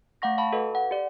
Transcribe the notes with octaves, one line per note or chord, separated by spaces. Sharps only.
A3 F5 F#5 C#6 A#6
F5 A5 B5 C#6
F#4 A4 B4 D#5 F5
F#5
G4 D5